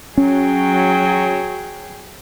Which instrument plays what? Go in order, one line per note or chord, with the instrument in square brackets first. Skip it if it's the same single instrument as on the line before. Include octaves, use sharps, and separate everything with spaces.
[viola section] F#3 [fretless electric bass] C#4 [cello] G#4 G5